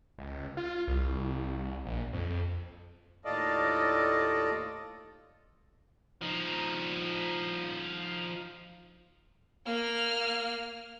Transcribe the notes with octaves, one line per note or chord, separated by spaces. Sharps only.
C#2
F4
C2
A#1
F2
D#2 A2 F4 A4 D5 D#5
F3 D#4
A#3 F6